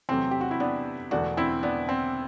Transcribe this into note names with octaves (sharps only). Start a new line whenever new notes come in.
E2 C3 F#3 A3 C4
G4
F#4
E4
B3 D4
E1 E2 D3 A3 D4 F#4
C4 E4
B3 D4
C4